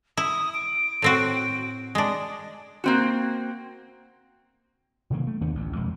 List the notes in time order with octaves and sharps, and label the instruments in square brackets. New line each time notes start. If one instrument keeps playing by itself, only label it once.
[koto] E4 [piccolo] D#6
[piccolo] D7
[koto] A2 C4 F#4
[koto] G#3 D4 [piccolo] D#6
[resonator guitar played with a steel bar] A#3 C4 F#4
[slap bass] C3 D#3 F#3 A#3
A3
D#2 D#3 B3 D4
A1 D2
E1 F2 G#3